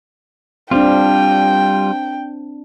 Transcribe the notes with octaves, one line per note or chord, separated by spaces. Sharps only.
G3 C4 D4 F4 G5